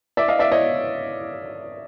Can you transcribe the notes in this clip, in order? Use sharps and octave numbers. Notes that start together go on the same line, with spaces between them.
D5 E5
D#5 F5
D5 E5
C#5 D#5